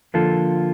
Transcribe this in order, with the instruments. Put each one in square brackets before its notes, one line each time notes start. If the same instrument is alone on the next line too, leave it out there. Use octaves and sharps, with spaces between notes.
[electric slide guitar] D3 F3 A#3 F4 A4